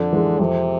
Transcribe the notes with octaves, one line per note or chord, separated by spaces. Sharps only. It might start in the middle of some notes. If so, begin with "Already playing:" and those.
Already playing: F2 D3
E3 G#3
F2 C3